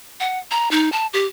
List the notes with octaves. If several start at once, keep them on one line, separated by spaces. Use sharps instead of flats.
F#5
A#5
D#4
A5
G4